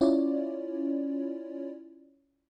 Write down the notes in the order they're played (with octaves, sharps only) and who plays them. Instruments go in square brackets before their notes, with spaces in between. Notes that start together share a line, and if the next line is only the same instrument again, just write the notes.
[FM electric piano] C#4 E4 F4 C#5 D5